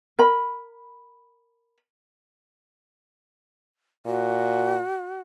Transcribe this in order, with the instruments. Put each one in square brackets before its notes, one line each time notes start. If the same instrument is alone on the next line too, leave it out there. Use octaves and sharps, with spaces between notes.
[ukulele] A#4 B5
[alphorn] A#2 [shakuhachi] F#4